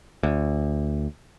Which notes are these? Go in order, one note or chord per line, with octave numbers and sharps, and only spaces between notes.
D2